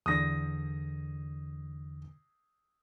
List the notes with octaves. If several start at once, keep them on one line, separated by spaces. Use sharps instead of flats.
E2 D3 D#6 A#6